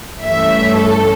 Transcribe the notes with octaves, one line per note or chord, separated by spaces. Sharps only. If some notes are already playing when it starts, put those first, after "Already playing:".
G2 E3 A3 C#4 E5
A4